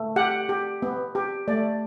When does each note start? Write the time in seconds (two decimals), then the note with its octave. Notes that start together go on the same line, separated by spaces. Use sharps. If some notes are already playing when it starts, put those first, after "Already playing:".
Already playing: A3
0.16 G4 F#5
0.49 G4
0.82 B3
1.15 G4
1.48 A3 D5